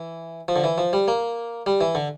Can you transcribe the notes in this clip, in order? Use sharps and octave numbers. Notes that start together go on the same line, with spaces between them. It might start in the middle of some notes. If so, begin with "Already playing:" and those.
Already playing: E3
F3
D3
E3
F3
G3
A#3
G3
E3
D3